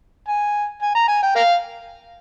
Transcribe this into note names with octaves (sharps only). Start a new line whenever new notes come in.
G#5
G#5
A#5
G#5
G5
A#4 F5